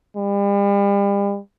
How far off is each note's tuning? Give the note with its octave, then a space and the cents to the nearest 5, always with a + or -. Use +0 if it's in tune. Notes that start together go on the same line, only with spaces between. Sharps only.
G3 +40